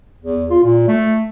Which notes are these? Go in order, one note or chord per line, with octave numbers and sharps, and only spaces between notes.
E2
F4
A#2
A3